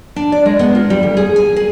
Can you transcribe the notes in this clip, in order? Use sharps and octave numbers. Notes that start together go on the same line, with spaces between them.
D4
D5
G#3
B3
F4
G3
D2
G#4
G#5
G#4